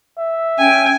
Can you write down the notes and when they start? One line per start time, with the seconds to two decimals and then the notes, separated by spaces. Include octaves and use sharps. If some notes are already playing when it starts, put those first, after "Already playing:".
0.18 E5
0.59 C#4 G5 G#5